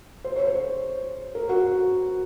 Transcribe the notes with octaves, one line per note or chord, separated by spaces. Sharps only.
C5
C#5
C5
A#4
F#4